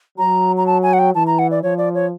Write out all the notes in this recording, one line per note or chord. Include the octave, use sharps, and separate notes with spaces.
F#3 A#5
A#5
A5
G#5
F#5
G5
E3 A5
A#5
F#5
D5
F3 C#5
D5
C#5